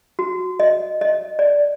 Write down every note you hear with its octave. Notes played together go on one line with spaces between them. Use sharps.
F#4
D#5
D#5
D5